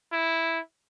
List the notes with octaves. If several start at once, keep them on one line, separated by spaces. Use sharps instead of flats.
E4